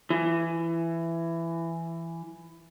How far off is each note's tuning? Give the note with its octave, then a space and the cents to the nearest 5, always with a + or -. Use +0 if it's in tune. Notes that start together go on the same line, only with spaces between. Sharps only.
E3 +15